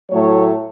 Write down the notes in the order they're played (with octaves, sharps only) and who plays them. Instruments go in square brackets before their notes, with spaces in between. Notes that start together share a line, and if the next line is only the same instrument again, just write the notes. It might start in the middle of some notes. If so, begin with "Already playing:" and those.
[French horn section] A2 F#3 A3 C#5